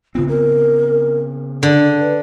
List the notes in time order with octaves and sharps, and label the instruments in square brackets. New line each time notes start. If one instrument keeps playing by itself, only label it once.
[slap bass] C#3 B3 C4 [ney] F4
[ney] A#4
[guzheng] D3 [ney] D5
[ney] B4